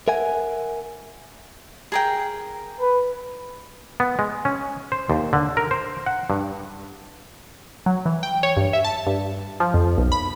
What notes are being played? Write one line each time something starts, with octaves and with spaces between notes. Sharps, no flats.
A#4 E5 F#5 G#5
G#4 A#4 G5
B4
B3
G#3
C#4
C5
D#2
D3
A#4
C5
F#5
G2
F#3
E3
G5
C#5
G2
E5
A5
G2
F3
F2
B1
B5